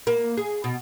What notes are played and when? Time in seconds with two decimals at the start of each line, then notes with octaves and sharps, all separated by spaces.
0.07 A#3
0.37 G#4
0.64 B2